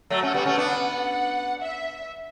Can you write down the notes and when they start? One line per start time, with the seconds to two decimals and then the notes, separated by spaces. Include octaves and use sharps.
0.10 F#3 A3
0.22 A3 C#4 F#5
0.34 G3 B3
0.46 A3 C#4
0.57 B3 D4
0.69 F#5
1.62 E5